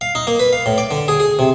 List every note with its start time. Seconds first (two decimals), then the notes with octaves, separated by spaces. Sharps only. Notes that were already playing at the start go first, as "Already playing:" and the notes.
0.01 F5
0.15 D#4
0.27 A#3
0.39 B4
0.53 F5
0.66 A2
0.78 D5
0.91 D3
1.08 G#4
1.20 G#4
1.39 C3